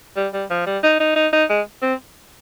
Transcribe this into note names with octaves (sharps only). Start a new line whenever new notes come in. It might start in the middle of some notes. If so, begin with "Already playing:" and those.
G3
G3
F3
G3
D#4
D#4
D#4
D#4
G#3
C4